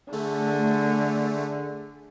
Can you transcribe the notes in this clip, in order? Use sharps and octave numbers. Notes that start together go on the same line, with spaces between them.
D3 A3 G#4